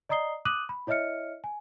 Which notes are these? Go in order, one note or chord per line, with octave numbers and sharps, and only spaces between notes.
D5 D#5 A#5 D#6 C7 G7
D6 D#6 F#6 D#7 F#7
B5
E4 C#5 D#5 E5 F6 C#7
G#5